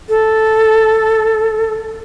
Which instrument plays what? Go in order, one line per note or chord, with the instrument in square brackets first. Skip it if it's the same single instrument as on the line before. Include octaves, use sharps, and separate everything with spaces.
[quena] A4